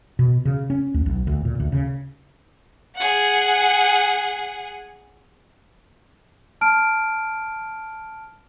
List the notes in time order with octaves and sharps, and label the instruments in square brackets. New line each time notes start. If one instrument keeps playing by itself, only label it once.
[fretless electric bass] B2
C#3
C#4
D2
B1
D2
A#2
D2
C#3
[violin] G#4 F#5
[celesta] A5 F6 D7